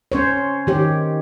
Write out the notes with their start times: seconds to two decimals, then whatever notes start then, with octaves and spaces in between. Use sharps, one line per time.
0.12 C#4 C5 C#5
0.67 D#3 G4 C#5